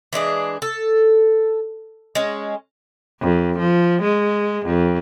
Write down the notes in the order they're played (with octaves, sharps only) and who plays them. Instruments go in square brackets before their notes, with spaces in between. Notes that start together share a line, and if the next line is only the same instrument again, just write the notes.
[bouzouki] E3 G#3 D4 G#4
A4
G#3 C#4
[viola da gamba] F2
F3
G#3
F2